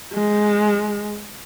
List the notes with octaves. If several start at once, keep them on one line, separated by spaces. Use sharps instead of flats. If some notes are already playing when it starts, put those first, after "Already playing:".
G#3